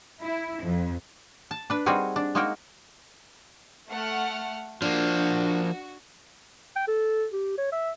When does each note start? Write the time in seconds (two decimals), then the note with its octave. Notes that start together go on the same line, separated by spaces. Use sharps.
0.22 E4
0.64 F2
1.51 A5
1.70 D4 B4
1.86 G3 C4 D#4 F#4 G#4 A#4
2.16 D4
2.35 G#3 A#3 D#4 F#4 A#4 G5
3.90 A3 F#5 F6
4.82 F3 A#3 D4 F#4
6.76 G5
6.88 A4
7.33 G4
7.58 C#5
7.72 E5